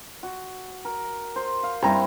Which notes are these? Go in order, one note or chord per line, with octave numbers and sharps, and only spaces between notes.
F#4
A#4
C5
F5
G2 C4 E4 A#5